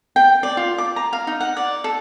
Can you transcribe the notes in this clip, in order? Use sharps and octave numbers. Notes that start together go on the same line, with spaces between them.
G5
D5
F4
D6
A#5
F5
D#4
F#5
D5
A4